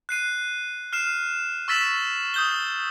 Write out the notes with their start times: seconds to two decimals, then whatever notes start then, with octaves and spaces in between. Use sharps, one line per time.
0.09 F#6 C7 D#7
0.93 F6 C7 E7
1.68 C#6 E6 A6 B6 E7 F#7
2.34 D#6 G6 G7